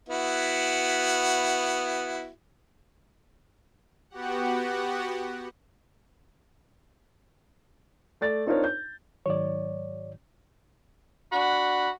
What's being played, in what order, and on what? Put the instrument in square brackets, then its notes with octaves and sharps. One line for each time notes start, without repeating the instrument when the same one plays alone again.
[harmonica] B3 E4 F#4
[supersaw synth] B3 F#4 G4 F#5
[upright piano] A3 D5 A6
C4 D4 D#4 F4 A#4 C#5
G6
[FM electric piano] G#2 D#3 F#3 [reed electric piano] C#5 D5
[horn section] D4 F#4 F#5 B5